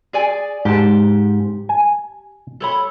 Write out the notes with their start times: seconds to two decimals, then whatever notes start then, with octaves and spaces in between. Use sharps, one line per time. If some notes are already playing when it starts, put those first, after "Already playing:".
0.13 G#4 D5 G#5
0.65 G#2 G4 A5
1.69 G#5
2.60 A4 C#5 B5